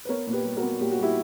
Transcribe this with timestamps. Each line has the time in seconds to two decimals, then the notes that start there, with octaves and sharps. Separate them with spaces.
0.05 B4
0.09 B3 A#4 C#5
0.27 A#2
0.33 G4 B4
0.45 G3
0.57 F#4 A#4
0.62 B3
0.81 A#2 G4
0.92 F#4
0.99 G3 E4 G4